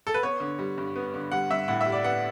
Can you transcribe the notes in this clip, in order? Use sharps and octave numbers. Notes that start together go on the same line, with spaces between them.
A4
B4
B3 C#5
D3
G3
G2
B3
D3
G3 F#5
G2 E5
A2 F#5
E5
G3
D5
B3 F#5